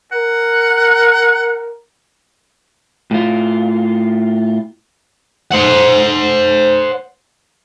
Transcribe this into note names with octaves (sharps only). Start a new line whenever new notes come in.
A#4 F#5
A2 F4
C5 F#5